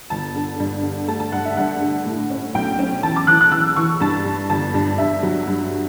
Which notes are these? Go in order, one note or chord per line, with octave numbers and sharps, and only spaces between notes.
G1 A5
D3
G2
D3
A3 A5
A5
G2 F#5
E5
G2 F#5
D3
A2
C#4
B1 G5
C#4
E3 A5
D6
E3 F#6
F#6
E3 E6
E3 C#6
G2 A5
G2
G1 A5
G2
G2 E5
F#3
G2